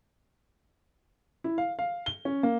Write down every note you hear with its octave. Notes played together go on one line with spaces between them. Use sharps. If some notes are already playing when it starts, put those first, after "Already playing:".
E4
F5
F5
G7
C#4
A#3